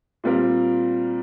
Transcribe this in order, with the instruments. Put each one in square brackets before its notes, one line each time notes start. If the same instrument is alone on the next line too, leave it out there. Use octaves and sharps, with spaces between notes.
[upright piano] A#2 G3 C4 F4 A#4